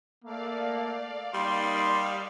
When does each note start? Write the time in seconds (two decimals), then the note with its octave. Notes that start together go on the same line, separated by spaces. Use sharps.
0.25 A3 A#3 D5 F5
1.34 G3 A#3 D#4 C6 D#6